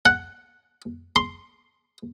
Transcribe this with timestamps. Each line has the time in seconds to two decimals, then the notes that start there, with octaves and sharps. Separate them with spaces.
0.06 F#5
1.16 C6